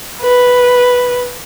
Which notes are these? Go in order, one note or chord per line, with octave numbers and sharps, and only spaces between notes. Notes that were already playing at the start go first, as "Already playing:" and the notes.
B4